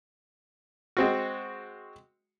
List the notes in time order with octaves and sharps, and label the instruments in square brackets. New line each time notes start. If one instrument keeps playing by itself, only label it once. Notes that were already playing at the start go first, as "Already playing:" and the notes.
[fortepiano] G#3 C4 F#4